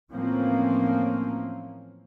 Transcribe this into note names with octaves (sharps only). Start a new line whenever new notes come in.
A2 E3 F3 A#3 C4 C#4